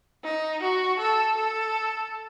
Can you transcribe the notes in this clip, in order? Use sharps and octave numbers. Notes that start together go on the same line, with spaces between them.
D#4
F#4
A4
A4